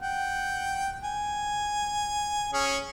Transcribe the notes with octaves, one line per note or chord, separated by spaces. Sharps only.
F#5 G5
G#5
C#4 G#4